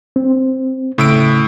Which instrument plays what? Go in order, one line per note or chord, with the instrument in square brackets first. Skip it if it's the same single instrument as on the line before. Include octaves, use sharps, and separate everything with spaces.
[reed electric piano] C4
[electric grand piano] A2 E6 D7 [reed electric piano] C#3